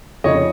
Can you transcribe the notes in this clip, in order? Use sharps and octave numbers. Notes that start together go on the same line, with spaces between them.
F1 F2 C#3 F3 C#5 D#5